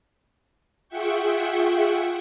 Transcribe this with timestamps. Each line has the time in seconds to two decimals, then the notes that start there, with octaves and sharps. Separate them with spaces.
0.88 F4 G#4 E5 F#5 G5 C#6